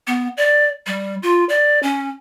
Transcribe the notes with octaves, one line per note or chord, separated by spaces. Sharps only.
B3
D5
G3
F4
D5
C#4